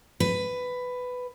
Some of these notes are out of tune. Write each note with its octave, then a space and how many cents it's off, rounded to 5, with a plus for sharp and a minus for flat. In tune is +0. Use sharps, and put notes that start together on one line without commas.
B4 +10